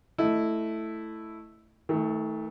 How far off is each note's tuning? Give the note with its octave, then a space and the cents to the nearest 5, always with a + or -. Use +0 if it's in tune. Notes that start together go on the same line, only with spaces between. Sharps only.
A3 +0 E4 +0 D#5 +0
D#3 +45 A3 +0